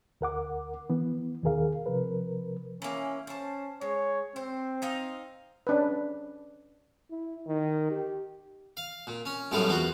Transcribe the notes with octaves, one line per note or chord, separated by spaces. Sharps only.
D2 A#4 F#5 D6
E3 B3
D#2 B2 D#3 G#4 A#4 F5
C3 F3 A#4 B4
E3 A#3 C#4
C#4 C5 A5
G#3 C#5
C4 C5
D#4 D#5 F5
C#4 D4 B4
E4
D#3
G4
F5
A#2
C#4
F#2 A2 G3 B3 F4
E2 F4 F#4